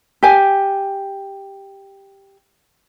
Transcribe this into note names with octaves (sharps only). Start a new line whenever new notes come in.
G4 G#5